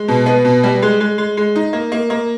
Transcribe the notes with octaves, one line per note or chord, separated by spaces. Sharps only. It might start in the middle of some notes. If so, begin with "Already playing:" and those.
Already playing: G#3
B2
B3
B2
G3
G#3
G#3
G#3
G#3
D#4
A#3
A#3
A#3